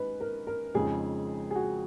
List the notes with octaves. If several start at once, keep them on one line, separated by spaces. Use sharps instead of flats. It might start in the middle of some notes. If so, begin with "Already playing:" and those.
Already playing: G#3 C#4 D#4 B4
A#4
A#4
F2 C#3 G#3 D#4 G#4
G#4
F#4